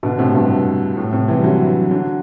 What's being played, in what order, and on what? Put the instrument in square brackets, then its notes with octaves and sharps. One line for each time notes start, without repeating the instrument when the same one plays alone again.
[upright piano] B2 D3
A2 C3
G2 B2
A2
A2 C3
C3 E3
G3
D3 F#3
D3 F#3